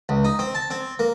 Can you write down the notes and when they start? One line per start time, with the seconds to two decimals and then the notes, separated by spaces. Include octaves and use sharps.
0.09 C#2
0.25 D#4
0.39 C4
0.55 A5
0.70 C4
0.99 A#3